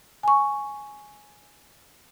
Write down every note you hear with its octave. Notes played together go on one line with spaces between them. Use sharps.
G#5 C#6